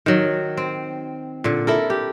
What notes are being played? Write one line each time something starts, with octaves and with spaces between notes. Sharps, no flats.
D#3 F#3
C4
A#2 D3
E4 A4 A#4
G4